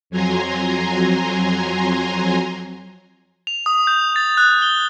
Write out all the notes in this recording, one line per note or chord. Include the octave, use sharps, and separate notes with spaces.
F2 F#3 G#5 A#5 C6
F7
D#6
G6
A6
F#6
G7